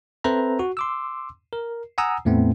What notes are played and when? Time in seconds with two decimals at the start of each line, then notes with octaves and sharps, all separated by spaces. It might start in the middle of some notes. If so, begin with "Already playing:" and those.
0.24 C4 A4 B4 C5 E5 A#5
0.59 F#4
0.77 C6 D6 E6
1.53 A#4
1.98 F#5 G#5 A#5 D#6 E6
2.25 E2 A2 A3 B3 C4